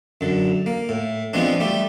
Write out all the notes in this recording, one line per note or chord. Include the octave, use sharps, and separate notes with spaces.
F#2 D3
A#3
A2
F3 G#3 B3 C4 D4
G3 A3 G4